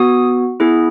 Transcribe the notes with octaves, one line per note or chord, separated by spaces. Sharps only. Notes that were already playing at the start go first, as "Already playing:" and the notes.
Already playing: B3 F#4 D#6
B3 E4 G#4